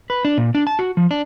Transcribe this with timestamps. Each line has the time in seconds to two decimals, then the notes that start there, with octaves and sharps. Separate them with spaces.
0.10 B4
0.25 D4
0.37 A#2
0.55 D4
0.67 A5
0.79 F#4
0.97 F3
1.11 D4